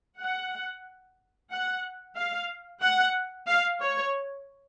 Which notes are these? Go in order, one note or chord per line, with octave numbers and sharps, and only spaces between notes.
F#5
F#5
F5
F#5
F5
C#5